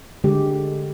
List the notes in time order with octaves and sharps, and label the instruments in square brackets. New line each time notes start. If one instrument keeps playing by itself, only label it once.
[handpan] D3 G#3 G4